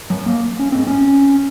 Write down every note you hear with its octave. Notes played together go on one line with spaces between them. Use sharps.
G#2 F#3
A#3
C#4
G#2 C4
C#4